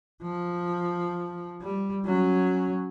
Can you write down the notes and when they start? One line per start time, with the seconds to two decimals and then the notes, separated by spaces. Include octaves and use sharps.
0.22 F3
1.61 G3
2.05 F#3 C#4